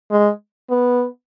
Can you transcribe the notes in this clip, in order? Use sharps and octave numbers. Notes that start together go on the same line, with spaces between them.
G#3
B3